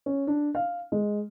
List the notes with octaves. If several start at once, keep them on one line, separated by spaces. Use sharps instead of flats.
C#4
D4
F5
G#3